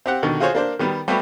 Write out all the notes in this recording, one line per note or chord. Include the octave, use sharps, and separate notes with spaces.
C4 G4 F#5
B2 D3 D#3
F4 F#4 G#4 C5 C#5
A#3 D4 C5
D#3 G3 B3
G3 A3 B3 F#4 G4